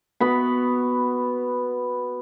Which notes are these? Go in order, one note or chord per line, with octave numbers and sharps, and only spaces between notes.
B3 F#4 B5